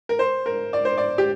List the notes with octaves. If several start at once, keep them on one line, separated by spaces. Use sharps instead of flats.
A#4
C5
A#4
D5
C5
D5
G4